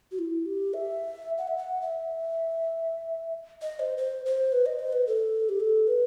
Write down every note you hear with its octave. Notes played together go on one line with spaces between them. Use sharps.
F#4
E4
G4
E5
F#5
E5
F#5
E5
D#5
C5
C5
C5
B4
D#5
C5
B4
A4
G4
A4
B4